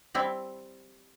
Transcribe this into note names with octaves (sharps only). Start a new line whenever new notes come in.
G3 C4 E4